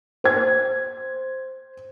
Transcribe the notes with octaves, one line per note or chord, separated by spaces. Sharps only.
C5 G#6